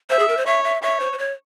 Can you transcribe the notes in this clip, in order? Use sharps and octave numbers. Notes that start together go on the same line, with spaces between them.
C5 E5
G#4
A#4
C5
C#5 E5
E5
C#5 E5
C5
C5
C#5